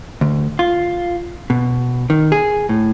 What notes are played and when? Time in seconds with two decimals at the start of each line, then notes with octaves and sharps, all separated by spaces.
0.21 D2
0.59 F4
1.50 B2
2.10 D#3
2.32 G#4
2.69 A2